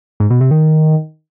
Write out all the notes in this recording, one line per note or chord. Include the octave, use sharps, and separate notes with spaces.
G#2
B2
C3
D#3